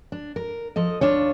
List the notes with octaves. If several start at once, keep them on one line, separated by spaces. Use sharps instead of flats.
D4
A#4
F3 A4 D#5
D#2 D4 F4 C#5